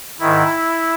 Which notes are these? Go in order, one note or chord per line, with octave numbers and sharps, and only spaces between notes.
G#2 D#3 E4